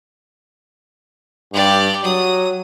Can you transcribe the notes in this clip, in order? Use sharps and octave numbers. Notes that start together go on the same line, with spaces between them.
G2 G4 D5
F#3 D#6